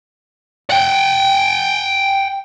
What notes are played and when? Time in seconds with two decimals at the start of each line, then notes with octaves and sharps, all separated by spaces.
0.70 F#5 G5